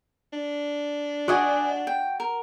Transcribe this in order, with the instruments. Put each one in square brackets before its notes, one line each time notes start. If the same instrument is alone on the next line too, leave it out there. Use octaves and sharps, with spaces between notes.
[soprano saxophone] D4
[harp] F#4 F#5 [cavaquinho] D5 D#5 G#5
[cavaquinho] G5
A#4